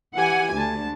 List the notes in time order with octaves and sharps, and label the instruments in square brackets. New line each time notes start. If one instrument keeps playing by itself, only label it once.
[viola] E3 G4 [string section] F#5 G#5
[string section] D2 [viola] D4 A5